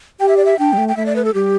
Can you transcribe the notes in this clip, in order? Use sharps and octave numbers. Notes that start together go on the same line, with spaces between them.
G4 G5
E5
D5
E5
D4 G5
G3
A3
G5
A3 E5
D5
B4
A4
G3 G4